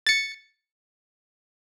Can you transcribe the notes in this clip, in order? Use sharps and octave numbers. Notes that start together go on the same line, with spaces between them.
A6 C#7